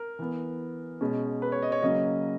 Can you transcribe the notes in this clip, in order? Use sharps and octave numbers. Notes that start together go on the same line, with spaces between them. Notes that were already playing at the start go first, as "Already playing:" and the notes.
Already playing: A#4
E3 B3
B2 G#3 C#4
B4
C#5
D#5
C#5
C#3 F#3 A#3 C#4 D#5